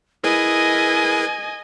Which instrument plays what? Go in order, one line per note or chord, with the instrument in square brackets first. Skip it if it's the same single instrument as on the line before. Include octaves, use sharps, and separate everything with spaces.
[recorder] E4 [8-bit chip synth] G#4 A#4 B4 [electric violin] D#5 G#5